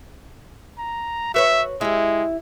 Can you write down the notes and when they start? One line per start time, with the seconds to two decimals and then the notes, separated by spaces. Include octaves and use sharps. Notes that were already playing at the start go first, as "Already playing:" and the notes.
0.79 A#5
1.34 F#4 B4 C#5 E5
1.81 G#3 E4 G4